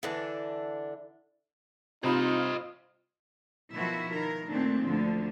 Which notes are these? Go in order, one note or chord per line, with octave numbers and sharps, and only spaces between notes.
D3 E3 D4
C3 D#4 F4 C5 D#5 B5
B2 D#3 F3 E4 F#4 E5
D#3 A#4
A#2 D#3 A3 C4 D4
D2 D3 F3 D4